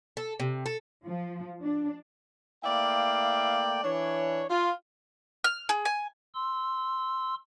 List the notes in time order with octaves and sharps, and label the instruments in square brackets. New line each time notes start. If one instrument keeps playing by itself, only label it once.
[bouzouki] A4
C3
A4
[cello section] F3
D4
[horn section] A3 A#3 E4 D5 F5 G5
E3 D4 C#5
F4
[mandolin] F6
G#4
G#5
[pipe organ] C6 E6